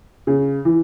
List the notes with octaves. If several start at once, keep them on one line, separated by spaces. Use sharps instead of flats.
C#3
E3